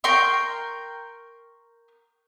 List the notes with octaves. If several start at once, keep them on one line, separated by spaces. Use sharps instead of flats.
A#4 G5 C6 C#6